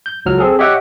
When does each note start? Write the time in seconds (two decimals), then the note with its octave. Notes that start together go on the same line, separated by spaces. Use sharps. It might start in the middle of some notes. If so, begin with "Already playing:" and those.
0.06 G6
0.26 C#2 F#3 F6
0.38 C4 G#4 A4
0.59 G4 C#5 D#5 E5 F#5 G5